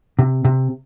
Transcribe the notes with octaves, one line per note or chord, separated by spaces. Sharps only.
C3
C3